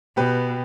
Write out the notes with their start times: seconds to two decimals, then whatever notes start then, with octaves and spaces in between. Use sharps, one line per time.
0.17 B2 G4 B4